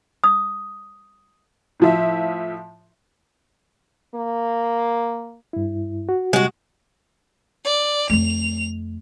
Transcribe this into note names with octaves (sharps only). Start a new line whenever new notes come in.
D#6
A2 F3 E5
A#3
G2 E4
F#4
C3 G3 G#3 F#4 G4
D5
F2 A3 F7